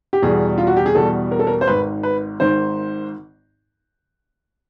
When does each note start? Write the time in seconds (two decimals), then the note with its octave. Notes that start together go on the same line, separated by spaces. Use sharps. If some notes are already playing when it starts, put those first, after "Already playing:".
0.13 G4
0.22 E2 B2 G3 G#4
0.58 F4
0.67 F#4
0.77 G4
0.86 G#4
0.95 E2 B2 G3 A4
1.31 A#4
1.39 A4
1.47 A#4
1.61 C5
1.67 G#1 G#2 D#3 B4
2.03 B4
2.40 G#1 G#2 D#3 C5